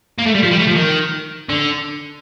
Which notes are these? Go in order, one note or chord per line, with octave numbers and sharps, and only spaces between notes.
A#3
A3
G3
F3
G3
A3
F3
D#3
D3